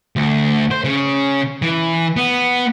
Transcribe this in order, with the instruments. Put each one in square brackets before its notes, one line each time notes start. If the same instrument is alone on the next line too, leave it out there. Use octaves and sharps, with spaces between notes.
[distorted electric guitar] D2
C5
C#3
E3
B3